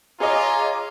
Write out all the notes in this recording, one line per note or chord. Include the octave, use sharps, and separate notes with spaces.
F4 G#4 C#5 D#5 G#5 A#5 D6